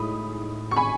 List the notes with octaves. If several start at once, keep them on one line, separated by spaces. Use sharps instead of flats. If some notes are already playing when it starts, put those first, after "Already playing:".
Already playing: A2 G#3 D#4 B5 D#6
C#6
G#5 B5